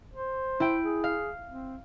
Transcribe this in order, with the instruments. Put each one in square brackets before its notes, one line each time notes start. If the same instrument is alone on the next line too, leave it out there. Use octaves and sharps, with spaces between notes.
[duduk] C5
[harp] E4 G5
[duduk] G#4
[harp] F5
[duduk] C4